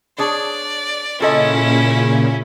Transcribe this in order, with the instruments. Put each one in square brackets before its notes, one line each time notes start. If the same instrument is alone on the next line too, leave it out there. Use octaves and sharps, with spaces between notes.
[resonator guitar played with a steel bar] D4 G#4 C#5 [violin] D5
[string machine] A#2 C#3 [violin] C#4 E4 [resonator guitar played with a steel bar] F4 A4 D#5